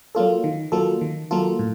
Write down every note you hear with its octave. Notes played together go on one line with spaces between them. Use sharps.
F#3 A#3 F4 A4
D#3
F#3 A#3 F4 A4
D#3
F#3 A#3 F4 A4
A2